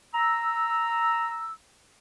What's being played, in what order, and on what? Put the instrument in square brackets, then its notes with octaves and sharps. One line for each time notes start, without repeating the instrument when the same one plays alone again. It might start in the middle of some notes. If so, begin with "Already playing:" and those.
[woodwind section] A#5 E6